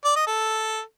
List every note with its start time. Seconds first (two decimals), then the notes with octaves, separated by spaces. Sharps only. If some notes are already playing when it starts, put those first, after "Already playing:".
0.05 D5
0.16 D#5
0.27 A4